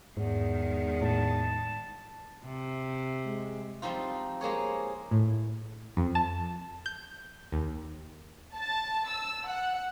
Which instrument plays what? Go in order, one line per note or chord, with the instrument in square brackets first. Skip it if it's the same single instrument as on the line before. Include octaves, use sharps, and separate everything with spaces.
[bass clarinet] E2 [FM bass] G#2 [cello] D#3 G#3
[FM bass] A2 [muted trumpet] A5
[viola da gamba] C3
[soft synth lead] G#3
[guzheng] F3 G3 C4 D#4 F4
G#3 A#3 G#4 C#5
[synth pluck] A2
F2
A5
G6
D#2
[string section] A5
E6
F#5